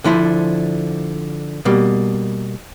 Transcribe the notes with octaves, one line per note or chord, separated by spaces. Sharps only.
D3 F3 E4 C5
B2 G3 A#3